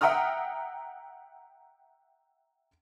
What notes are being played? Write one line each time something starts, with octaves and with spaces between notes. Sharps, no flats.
E5 F#5 G5 A#5 D#6 F6